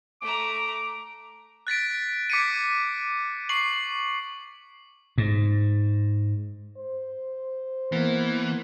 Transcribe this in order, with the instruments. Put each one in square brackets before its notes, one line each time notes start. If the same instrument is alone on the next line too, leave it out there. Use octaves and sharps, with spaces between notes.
[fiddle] A3 A#5 [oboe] D6
[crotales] F#6 A6 B6 D7
D6 G#6 B6 C#7 D#7
C#6 C7 F#7
[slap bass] G#2
[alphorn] C5
[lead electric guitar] E3 [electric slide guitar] A#3 B3